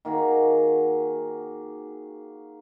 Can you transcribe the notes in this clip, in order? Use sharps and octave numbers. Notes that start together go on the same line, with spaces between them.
D#3 A#3 F#4 G#4